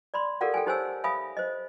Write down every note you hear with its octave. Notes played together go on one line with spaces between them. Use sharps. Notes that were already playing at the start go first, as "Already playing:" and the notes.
D5 B5 C6
G4 A4 A#4 D5 F5 F#5
A4 G5 G#5
D#4 G4 C5 C#5 G#5 E6
E5 F5 G#5 B5 D#6
C5 D#5